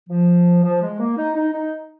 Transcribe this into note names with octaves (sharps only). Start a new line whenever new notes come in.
F3
F3
G#3
A#3
D#4
D#4
D#4